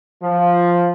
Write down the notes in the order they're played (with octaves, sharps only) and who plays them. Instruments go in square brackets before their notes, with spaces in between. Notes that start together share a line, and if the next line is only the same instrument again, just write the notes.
[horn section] F3